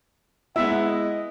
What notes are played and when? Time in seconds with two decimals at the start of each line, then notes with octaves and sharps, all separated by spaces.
0.56 G#3 B3 E4 E5 F#5
0.86 D#5